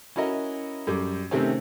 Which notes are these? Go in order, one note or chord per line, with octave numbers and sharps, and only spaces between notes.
C#4 E4 F#4 A#4 D#5
F#2 G3 D6
C3 D#3 A3 C4 C#4